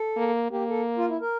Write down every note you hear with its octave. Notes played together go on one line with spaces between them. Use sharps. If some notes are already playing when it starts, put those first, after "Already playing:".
Already playing: A4
A#3
A#3 G4
A4
F4
E4
A#4